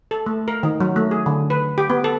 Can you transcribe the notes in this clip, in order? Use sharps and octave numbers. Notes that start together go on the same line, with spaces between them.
A4
A3
A#4
D#3
F#3
A3
G#4
D3
B4
G4
B3
A4